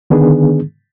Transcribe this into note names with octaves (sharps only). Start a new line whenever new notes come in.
D3 D#3 B3 D4 G#4